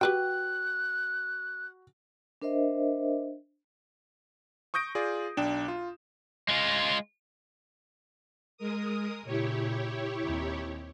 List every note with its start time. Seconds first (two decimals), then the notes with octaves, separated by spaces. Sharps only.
0.01 F#4 G4 B4 G5 F#6
2.42 D4 A#4 C5 D#5 E5
4.74 C#6 D#6 G6 A#6 D7
4.95 F4 G#4 D5
5.37 B1 D4 G5 E7
5.68 F4
6.48 G#3 F4
8.58 G#3 A#4 D#6
9.25 A#2 C#3 E4 G4 C#5
10.24 D#2 C4